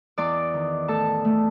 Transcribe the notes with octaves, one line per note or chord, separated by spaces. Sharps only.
E2 D5 D6
D#3
A2 A4 A5
A3